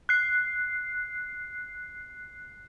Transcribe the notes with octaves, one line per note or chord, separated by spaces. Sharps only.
F#6 C7